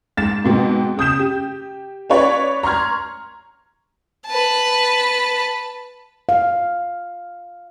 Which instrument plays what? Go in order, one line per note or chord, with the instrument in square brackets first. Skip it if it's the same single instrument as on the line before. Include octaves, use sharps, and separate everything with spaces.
[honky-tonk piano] G#2 A6 E7
G#2 B2 C4
C#3 D#6 G6 E7
G4
C#4 B4 C#5 D5
A#5 C6 C#6 F6 G#6
[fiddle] B4 A5
[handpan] F5